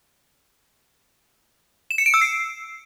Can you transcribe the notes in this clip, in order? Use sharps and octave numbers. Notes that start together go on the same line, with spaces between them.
E7
C#7
D7
E6
C7